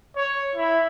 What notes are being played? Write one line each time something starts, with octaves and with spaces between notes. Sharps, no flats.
C#5
E4